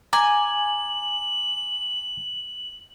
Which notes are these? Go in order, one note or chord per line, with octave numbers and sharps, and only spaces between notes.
G#5 A#5 D6 F#7